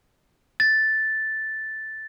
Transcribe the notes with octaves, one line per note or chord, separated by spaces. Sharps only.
A6